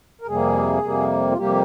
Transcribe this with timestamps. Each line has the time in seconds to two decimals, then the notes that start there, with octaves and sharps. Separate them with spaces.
0.21 A#4
0.27 F2 C3 G3 A#3 G#4
0.82 F2 C3 G3 A#3
1.31 F4
1.37 F2 C3 G3 A#3 G4